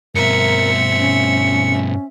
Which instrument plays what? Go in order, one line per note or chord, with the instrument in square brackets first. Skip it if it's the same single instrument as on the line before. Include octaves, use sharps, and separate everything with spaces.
[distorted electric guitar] G2 B2 [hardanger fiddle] C4 E5 [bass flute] A#4 [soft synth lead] C#7
[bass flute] C#4